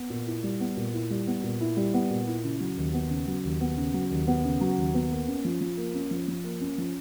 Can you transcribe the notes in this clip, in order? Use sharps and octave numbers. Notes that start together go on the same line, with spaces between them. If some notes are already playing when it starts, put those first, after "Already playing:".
Already playing: B3
A#2
E4
G3
B3
A#2
E4
G3
B3
A#2
E4
G3
B3
A#2
E4
C#3
F#3
D#2
B3
C#3
F#3
D#2
B3
C#3
F#3
D#2
B3
C#3
F#3
D#2
B3
A#3
C#4
F3
F3
A#3
C#4
F3
F3
A#3
C#4
F3